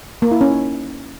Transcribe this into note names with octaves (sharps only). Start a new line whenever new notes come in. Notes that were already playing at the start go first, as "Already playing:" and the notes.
A#3
E4
C#4
D#4